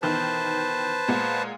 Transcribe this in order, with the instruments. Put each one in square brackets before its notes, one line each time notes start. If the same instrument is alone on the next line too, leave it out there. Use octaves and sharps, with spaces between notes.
[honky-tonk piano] B2 D#3 E3 [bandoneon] B4 C5 A5
[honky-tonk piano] A#2 G#3 F#5